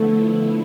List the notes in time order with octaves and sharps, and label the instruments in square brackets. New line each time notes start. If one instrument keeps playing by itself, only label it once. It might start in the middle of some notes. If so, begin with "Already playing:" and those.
Already playing: [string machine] D3 F3 B3 E4 [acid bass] A3